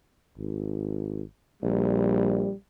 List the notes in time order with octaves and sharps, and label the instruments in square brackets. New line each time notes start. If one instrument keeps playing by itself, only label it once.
[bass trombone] G#1
[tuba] A#1 [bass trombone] G3